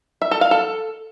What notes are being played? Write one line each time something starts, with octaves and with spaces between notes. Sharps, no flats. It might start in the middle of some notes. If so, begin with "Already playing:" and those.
E5
A4
F5
A4